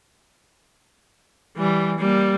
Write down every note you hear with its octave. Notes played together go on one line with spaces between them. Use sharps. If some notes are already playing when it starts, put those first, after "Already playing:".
E3 G3
G3 A#3